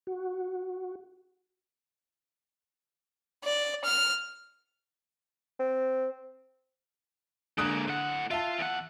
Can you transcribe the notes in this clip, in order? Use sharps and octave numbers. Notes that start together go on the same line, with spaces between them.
F#4
D5
F6
C4
D3 G#3 A#3 D#6 F#6
A2 F#5
F4 E5 A5
E2 F#5